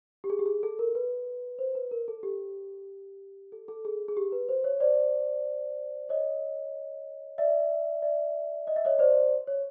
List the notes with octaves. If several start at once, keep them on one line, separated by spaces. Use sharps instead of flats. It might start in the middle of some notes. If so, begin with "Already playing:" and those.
G4
G#4
G4
G#4
A4
A#4
B4
C5
B4
A#4
A4
G4
A4
A4
G#4
G#4
G4
B4
C5
C#5
C5 D5
C#5 D#5
D5 E5
D5 E5
D#5
E5
C#5 D#5
C5 D5
C#5